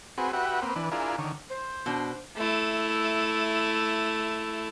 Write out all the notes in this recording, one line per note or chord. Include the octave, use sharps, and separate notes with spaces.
C4 F#4 G#4 B4
F#4 G4 B4 E5 F#5
A#3 C4 B4
E3 D4 B4
D4 E4 F4 G#4 A#4
D3 D#3 C#5
C5
B2 D4
A3 E4